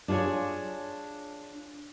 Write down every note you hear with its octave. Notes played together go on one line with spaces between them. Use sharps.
D4 F4 F#4 G#4 C#5